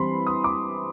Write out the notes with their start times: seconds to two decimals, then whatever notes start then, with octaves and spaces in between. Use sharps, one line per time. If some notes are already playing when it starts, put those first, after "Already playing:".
Already playing: E3 G3 C4 B5 C6
0.27 D#6
0.44 D6